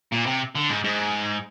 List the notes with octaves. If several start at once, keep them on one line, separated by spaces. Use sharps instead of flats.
A#2
C3
D3
G#2
G#2